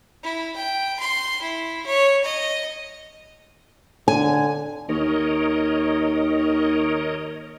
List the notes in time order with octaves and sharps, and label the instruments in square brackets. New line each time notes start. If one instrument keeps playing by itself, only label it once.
[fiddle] E4
G5
C6
E4
C#5
D#5
[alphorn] D3 [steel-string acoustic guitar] G#5
[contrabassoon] D#2 [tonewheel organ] A#4 C#5 D#5